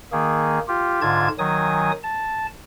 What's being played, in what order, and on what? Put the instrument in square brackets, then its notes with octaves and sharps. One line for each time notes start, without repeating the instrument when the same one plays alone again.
[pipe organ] D#3 A#3 G#4
F4 G4
G#2 D3 F4 A5 G#6
D#3 F#3 G#5 D#6
A5